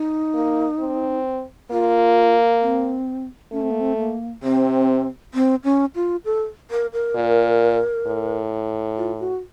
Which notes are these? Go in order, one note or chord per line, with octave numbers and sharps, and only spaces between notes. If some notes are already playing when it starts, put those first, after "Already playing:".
Already playing: D#4
A#3
C4
A#3 F4
C4
A3 C#4
C4
A#3
C4
A#3
C3 C4
C4
C#4
F4
A4
A#4
A#4
A#2
A2
F4
F#4